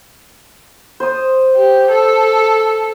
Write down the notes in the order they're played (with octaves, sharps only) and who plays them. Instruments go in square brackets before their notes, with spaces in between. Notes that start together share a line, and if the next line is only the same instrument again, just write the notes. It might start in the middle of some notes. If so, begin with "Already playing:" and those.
[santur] C5 D#6
[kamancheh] G4
A4